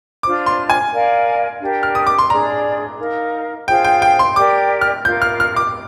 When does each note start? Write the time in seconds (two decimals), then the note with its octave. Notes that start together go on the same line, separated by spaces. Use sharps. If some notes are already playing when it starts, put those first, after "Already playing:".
0.23 D4 F4 C5 D6
0.46 C6
0.70 G#5
0.92 A#4 D5 F5 G#5
1.61 D4 G4 A#4
1.83 F6
1.95 D#6
2.07 D6
2.18 C6
2.30 D4 G#4 D5 A#5
2.99 D#4 A#4 F5
3.68 F4 G#4 C5 F5 G5
3.84 G5
4.02 G5
4.19 C6
4.36 G4 A#4 D5 D6
4.81 F6
5.05 F4 A#4 F5 G6
5.22 F6
5.40 F6
5.56 D6